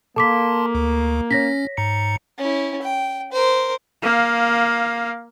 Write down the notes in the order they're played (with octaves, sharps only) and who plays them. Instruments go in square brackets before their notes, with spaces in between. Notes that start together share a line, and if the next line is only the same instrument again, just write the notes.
[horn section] A#3 [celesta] A4 D6 B6 [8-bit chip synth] A5 C6
[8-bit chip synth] D2
[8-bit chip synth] C#4 [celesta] C#5 A#6 B6
[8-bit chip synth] G#2 A#5 C#7
[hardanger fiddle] C#4 E4
G5
A#4 C5
[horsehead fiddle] A#3 F5